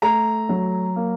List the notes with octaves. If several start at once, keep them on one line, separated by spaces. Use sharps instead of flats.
A3 A#5
F#3
A#3